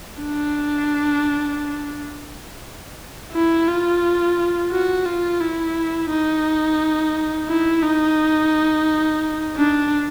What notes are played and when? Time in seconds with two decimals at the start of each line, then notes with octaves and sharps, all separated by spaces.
0.21 D4
3.33 E4
3.68 F4
4.71 F#4
5.06 F4
5.41 E4
6.10 D#4
7.48 E4
7.83 D#4
9.57 D4